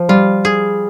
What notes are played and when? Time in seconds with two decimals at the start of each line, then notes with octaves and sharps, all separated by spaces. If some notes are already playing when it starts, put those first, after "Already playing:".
Already playing: F3
0.09 G3 F4
0.45 G#4